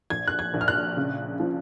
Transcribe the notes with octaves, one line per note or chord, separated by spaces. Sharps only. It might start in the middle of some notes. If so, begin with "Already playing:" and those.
A#1 G#6
F#6
G#6
A#1
F6
F#6
C#3
F3